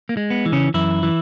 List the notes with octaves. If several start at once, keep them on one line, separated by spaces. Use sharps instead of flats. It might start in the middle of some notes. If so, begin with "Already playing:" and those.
A#3
G#3
B3
E3
C#3 C#4
F#2 E3 E4
E3